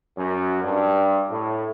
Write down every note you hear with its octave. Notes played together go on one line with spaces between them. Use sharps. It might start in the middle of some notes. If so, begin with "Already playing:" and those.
F#2
G2
A2